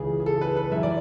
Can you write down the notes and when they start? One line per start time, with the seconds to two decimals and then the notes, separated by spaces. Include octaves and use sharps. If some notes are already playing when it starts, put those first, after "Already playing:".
Already playing: C#2 C#3 E3 G#4
0.20 G#4
0.26 A4
0.41 B4
0.56 B4
0.71 F#2 E3 E5
0.83 D5